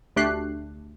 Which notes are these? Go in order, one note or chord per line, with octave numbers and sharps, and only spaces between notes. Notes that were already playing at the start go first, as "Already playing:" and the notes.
D2 A3 D4 G4 F#6 C7